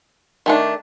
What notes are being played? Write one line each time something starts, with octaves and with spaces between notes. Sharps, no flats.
D#3 A3 D4